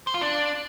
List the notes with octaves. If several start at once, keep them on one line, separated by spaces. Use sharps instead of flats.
C5
F4
D4